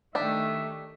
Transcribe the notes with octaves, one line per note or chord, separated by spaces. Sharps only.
D#3 A3 D4 G4 E5